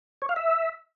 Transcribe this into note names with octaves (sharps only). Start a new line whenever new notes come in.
C#5
F5
E5